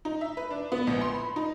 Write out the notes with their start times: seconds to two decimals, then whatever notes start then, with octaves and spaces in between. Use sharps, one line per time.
0.05 D#4
0.21 E5
0.37 B4
0.50 D4
0.72 B3
0.87 A#1
1.01 C6
1.14 B5
1.36 D#4